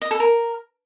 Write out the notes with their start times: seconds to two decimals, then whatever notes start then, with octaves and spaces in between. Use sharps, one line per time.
0.02 D#5
0.11 A4
0.20 A#4